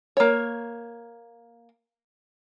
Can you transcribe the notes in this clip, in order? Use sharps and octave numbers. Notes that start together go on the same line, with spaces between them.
A#3 C#5